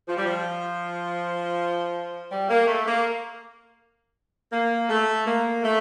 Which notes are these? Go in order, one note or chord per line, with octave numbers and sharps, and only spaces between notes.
F3
G3
F3
G3
A#3
A3
A#3
A#3
A3
A#3
A3